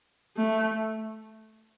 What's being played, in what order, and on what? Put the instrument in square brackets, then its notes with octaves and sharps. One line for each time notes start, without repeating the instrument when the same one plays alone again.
[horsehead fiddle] A3